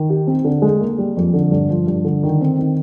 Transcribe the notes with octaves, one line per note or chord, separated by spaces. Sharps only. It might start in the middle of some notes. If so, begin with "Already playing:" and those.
Already playing: D#3
G4
C4
D3
G#3
A#3
G3
F2
D3
G2
F3
G2
D3
D#3
C4
D#3